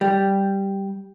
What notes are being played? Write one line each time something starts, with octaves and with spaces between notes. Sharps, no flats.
G3